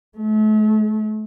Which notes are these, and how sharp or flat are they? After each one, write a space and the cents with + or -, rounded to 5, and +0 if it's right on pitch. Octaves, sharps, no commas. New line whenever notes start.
A3 -40